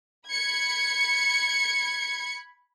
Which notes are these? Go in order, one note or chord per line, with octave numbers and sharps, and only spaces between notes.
B5 G#6 C#7